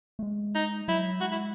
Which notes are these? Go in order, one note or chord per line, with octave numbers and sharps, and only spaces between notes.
A3
G#3
D#4
F#3 E4
G#3 F#4
E4